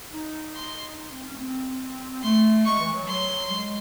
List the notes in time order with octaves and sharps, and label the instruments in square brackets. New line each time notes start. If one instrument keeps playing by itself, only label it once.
[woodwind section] D#4
[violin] C6
[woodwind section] D#4
C4
C#4
A3
C4
[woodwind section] A3 [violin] C6
[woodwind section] G#3 [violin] C#6
[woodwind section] E3
F#3
[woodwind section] F#3 [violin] C6
[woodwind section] G#3